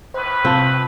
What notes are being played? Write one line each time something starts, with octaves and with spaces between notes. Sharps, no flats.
D#2 A2 B4 C5
C3 C4 F4 A5